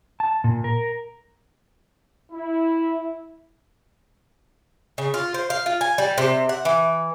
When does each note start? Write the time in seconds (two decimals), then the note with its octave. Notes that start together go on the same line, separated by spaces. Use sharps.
0.20 A5
0.44 A#2
0.64 A#4
2.32 E4
4.98 C#3
5.14 F4
5.34 C5
5.50 F5
5.66 F4
5.81 G#5
5.98 G3
6.18 C3
6.49 F#5
6.65 E3